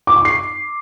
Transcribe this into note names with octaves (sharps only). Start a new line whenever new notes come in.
D6
C#6
C7